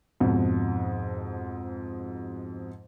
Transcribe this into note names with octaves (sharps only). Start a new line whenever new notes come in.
F2 G#2 B2